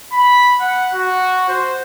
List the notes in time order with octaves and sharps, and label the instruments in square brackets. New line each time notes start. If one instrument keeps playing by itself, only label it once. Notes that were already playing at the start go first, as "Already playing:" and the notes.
[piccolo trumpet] B5
F#5
F#4
C5